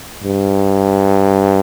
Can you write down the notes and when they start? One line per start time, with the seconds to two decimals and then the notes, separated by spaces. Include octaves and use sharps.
0.24 G2